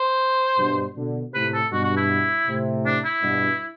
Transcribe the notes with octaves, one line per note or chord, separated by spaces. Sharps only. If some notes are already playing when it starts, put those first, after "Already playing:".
Already playing: C5
G2 B2
B2 D3
A2 C3 B4
A4
G2 B2 F#4
F#4
E4
A2 C3
D4
E4
G2 B2